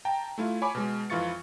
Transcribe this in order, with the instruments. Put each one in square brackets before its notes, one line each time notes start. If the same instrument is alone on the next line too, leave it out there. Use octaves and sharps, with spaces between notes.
[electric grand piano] G5 A5 A#5
A3 E4 F4
C#5 G#5 B5 D6
B2 G#3
F2 E3 F4 C#6 A6 C#7